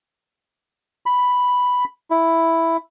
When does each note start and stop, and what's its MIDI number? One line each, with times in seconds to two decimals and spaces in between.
1.06 1.84 83
2.11 2.77 64